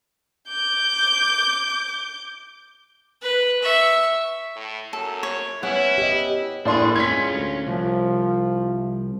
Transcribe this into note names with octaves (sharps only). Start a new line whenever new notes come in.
D6 G6
B4
E5 C#6
A2
F#2 A4
C#5
B3 C#4 E4 F#5
G4 D#5
A2 A#3 D4 G#4 D5 C6
G#3 C#4 F4 G#6 B6
D2
C2 F3